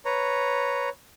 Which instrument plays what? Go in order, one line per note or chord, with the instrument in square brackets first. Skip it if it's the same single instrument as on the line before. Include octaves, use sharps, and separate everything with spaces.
[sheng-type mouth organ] B4 C#5 A#5